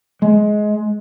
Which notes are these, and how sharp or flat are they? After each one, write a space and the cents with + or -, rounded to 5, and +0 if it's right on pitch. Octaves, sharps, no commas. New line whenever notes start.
G#3 +20